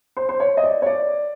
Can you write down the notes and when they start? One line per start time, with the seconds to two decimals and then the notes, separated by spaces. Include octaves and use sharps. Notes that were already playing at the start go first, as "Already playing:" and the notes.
0.17 C5
0.29 C5
0.40 C#5
0.57 D#5
0.64 D5
0.82 C#5
0.86 D5